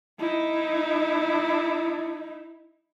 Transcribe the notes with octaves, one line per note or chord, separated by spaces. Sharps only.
D#4 E4